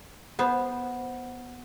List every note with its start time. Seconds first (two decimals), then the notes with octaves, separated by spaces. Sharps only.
0.39 B3 C5